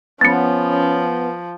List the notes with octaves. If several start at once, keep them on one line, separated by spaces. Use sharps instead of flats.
F3 B3 C#4 A6 C#7